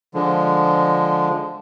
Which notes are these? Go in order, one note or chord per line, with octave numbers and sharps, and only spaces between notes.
D3 F3 G#3